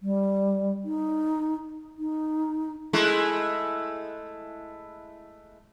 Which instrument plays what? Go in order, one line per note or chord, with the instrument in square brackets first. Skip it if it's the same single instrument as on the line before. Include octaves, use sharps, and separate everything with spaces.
[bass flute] G3
D#4
D#4
[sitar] G#3 A3 E4